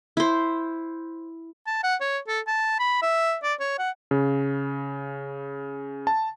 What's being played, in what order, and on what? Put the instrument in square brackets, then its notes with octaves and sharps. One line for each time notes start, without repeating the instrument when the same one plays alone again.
[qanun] E4 C5
[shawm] A5
F#5
C#5
A4
A5
B5
E5
D5
C#5
F#5
[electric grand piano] C#3
A5